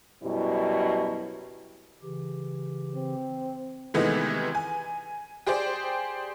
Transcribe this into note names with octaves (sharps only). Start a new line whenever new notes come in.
F#2 B2 G3 E4
C#3 E3 G4
C4
C3 D#3 E3 G#3 A3 B3
G#5
G4 G#4 C5 D5 G5